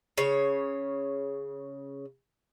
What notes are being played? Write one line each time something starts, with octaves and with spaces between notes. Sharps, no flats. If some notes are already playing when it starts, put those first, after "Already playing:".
C#3 C#5